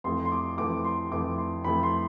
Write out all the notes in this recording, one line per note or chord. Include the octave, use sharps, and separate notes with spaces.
F2 E3 A3 C6
C6
D6
F2 E3 A3 D6
C6
F2 E3 A3 D6
C6
F2 E3 A3 B5
C6